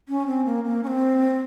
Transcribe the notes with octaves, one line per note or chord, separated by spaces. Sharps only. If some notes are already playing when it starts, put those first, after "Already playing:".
C#4
C4
A#3
A#3
C#4
C4